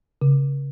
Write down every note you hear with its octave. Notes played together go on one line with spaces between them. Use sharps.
C#3